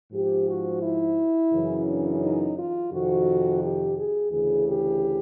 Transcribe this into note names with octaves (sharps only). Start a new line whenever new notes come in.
G#2 F3 G4
F#4
E4
F#2 C#3 E3
D4
D#4
F4
F2 C3 D#3 F#4
G4
G#4
D2 C#3 E3 G#4
G4